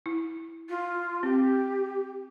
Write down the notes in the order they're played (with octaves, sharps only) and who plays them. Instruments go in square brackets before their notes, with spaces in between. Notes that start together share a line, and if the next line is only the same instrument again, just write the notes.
[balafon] E4
[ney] F4
[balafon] C4 [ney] G4